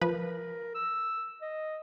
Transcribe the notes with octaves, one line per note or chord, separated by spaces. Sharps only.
F3 A#4 B4
E6
D#5